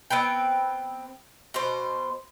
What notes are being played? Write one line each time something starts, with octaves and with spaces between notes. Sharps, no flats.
B3 C4 B4 G5
B2 C5